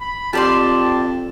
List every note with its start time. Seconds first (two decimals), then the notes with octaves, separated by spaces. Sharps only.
0.01 B5
0.33 F2 G4 D5 A5 C6